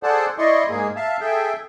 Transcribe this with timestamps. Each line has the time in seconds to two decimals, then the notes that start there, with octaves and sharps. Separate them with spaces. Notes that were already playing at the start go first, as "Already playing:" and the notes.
0.03 G#4 A4 C5 D5 F#5 A5
0.38 E4 D5 D#5 C6 C#6
0.69 G#2 A#3 G#4
0.96 E5 F5 A5
1.21 G#4 A4 E5 G5